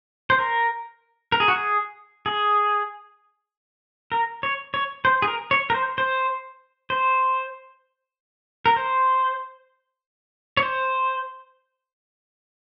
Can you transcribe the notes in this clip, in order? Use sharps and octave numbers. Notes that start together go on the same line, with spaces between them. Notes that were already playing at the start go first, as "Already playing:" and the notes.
C5
A#4
A#4
G#4
F#4
G#4
G#4
A#4
C#5
C#5
C5
G#4
A#4
C#5
A#4
C5
C5
C5
A#4
C5
C#5
C5